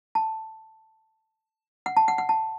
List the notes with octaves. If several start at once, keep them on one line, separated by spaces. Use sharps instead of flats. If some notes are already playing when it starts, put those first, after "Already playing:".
A5
F#5
A5
F#5
F#5
A5